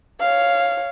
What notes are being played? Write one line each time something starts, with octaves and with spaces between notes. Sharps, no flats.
C#5 F5